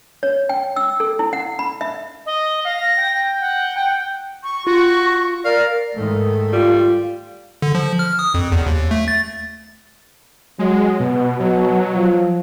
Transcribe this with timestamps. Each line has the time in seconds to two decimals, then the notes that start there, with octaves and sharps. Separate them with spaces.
0.23 C#5
0.49 G5
0.76 E6
1.00 A4
1.19 E4
1.33 F#5
1.59 B5
1.81 E5
2.26 D#5
2.65 F5 A#6
2.98 G5
3.40 F#5
3.76 G5
4.43 C#6
4.67 F4 F#4
5.45 A#4 D5 F5
5.95 G#2 D#3 A3
6.53 G3 F4
7.62 D3
7.75 F3
7.99 F6
8.19 D#6
8.34 F2
8.52 E2
8.66 D#2
8.91 A3
9.08 A6
10.59 F#3 G#3
11.00 B2 B3
11.40 B2 F#3
11.94 F3